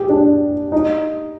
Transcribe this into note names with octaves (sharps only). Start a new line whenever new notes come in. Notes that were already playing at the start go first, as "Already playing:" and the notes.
Already playing: G4 G#4
D4
D#4